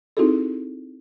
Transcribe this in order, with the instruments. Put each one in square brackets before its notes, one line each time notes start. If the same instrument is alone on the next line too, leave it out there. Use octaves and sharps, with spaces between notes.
[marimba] C4 D#4 E4 F#4 G#4 A4